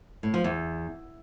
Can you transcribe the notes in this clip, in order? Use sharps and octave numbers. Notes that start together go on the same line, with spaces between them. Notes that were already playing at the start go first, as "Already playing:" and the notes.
A2
F3
E2